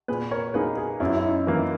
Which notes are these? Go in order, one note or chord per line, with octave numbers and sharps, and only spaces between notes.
A#2 G#4 B4
A#4 C#5
A#3 D#4 G#4 B4
G#4 B4
F#2 C#4 E4
E4
D#4
E3 A#3 D#4